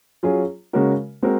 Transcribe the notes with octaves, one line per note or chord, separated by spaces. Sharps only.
F#3 C#4 F4 G#4
C#3 G#3 C#4 F#4 A#4
G#3 C4 F#4 A#4